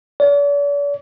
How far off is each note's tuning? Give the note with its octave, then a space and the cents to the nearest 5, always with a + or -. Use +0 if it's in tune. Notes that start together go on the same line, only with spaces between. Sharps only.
D5 -45